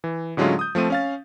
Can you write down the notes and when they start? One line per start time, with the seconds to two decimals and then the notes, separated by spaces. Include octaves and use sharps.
0.04 E3
0.37 A2 D3 F#3 G#3 C#4 F4
0.59 D#6 G6
0.75 F3 A3 C4 D#7
0.90 C#4 F5 A6